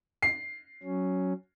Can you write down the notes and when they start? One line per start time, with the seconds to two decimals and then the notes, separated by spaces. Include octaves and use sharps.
0.22 C7
0.83 F#3 C#4